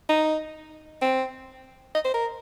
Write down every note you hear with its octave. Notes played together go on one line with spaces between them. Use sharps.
D#4
C4
D#5
C5
A#4